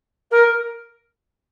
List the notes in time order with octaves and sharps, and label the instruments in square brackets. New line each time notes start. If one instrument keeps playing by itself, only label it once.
[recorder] A#4